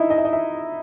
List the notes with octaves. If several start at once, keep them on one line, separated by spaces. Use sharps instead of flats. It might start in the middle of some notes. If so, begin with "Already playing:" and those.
Already playing: D#4 E4 D#5 E5
D#5
E5
D#5
E5